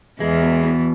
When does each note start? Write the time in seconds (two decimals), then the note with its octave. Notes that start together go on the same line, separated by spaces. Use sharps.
0.20 E2 E3 G#3
0.42 B2
0.64 B2